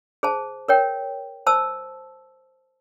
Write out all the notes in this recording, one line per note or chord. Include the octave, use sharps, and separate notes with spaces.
G#4 C5 A5
A#4 C#5 G5
C5 A5 E6